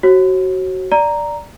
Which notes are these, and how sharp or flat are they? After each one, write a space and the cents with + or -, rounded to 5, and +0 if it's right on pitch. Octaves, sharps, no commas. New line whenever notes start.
F#4 +20 C#5 -45
D5 +0 A#5 +0